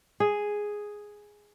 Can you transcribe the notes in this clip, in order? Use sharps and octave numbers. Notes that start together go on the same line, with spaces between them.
G#4